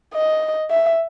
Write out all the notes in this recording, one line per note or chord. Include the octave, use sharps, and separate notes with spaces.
D#5
E5